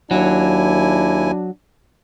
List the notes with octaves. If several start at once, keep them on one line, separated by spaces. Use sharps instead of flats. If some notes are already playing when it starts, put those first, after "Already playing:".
D#2 F#3 D4 E4 G#5